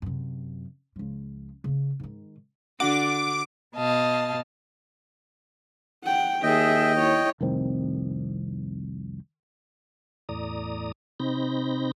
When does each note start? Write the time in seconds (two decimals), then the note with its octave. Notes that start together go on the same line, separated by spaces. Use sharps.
0.02 F#2 C3
0.96 C#2 F3
1.64 C#3 A3
2.00 G#2 D#3
2.80 D3 D4 F#4 D6
3.76 B2 D#5 F5 A5
6.04 F#5 G5
6.43 D#2 G#4 D#5 E5 G5
6.98 E4 C#5
7.41 F1 C2 D#3 C4
10.29 E2 A2 D5 A#5 D#6
11.20 C3 C4 D#4 B5 G6 A#6